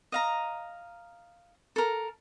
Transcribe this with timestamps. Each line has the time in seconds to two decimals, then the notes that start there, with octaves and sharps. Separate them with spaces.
0.12 D#5 F5 A#5
1.76 A4 A#4